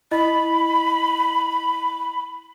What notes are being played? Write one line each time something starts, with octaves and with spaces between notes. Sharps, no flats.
E4 D#5 B5